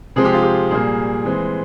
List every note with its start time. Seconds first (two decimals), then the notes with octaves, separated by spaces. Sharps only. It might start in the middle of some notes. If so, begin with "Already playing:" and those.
0.16 C3 F3 G#3 C4 G#4
0.25 G4
0.34 F4
0.43 G4
0.71 A#2 G3 A#3 G#4
1.25 E3 G#3 C4